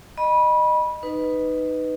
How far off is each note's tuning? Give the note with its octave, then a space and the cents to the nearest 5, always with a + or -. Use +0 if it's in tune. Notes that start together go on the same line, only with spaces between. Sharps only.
D#5 -20 B5 -25
D#4 -10 B4 +10 D#5 +0